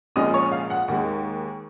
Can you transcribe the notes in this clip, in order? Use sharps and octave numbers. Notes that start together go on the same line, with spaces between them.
A#1 A#2 G#3 C#4 D#5 D#6
C#5 C#6
F5
F#5
D#2 D#3 G#3 F#5